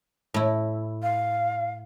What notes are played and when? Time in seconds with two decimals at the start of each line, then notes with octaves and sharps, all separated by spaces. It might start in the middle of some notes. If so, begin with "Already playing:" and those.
0.34 A2 E4
1.03 F5